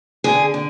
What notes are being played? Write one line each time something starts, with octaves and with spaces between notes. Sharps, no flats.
D3 G#4
D3